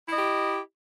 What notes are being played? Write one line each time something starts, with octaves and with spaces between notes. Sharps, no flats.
E4 G4 D#5